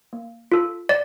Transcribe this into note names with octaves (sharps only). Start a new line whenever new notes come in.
A#3
F4 A4
D5